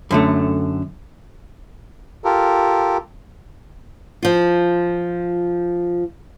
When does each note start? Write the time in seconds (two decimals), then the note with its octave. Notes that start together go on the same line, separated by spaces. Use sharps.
0.11 F#2 D3 A3
2.24 F4 G4 A4 A#4
4.22 F3 F4